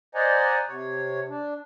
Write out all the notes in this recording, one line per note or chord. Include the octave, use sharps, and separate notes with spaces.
C5 D5 D#5 F#5 G#5 A#5
C3 C#5
D4